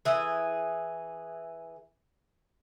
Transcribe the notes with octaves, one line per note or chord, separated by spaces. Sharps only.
E3 G#4